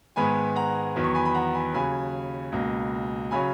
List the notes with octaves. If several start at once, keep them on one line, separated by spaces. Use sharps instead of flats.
G#2 D#3 G#3 B3 G#5 B5
F#5 A#5
E2 D#3 F#3 B3
C#6
G#5 B5
B5
F#5 A#5
G#5 B5
D#2 C#3 F#3 G#5 B5
C#2 B2 A#3
C#3 F#3 C#4 G#5 B5